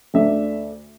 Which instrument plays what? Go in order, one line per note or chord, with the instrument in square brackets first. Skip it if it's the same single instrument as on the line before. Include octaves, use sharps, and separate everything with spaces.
[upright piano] D2 D3 A3 D4 E5